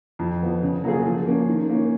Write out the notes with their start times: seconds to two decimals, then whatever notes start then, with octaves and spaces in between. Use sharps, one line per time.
0.19 F2
0.41 F3 B3
0.62 C#3
0.84 F#3 A#3 F4 G#4
1.06 F3
1.26 A#3 C#4
1.48 D#3
1.70 A#3 C#4